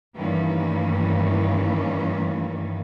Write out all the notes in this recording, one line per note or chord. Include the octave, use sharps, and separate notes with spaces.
G2 D#3 E3 A3 A#3 C#4